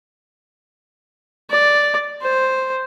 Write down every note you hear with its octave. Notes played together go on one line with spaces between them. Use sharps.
D5
C5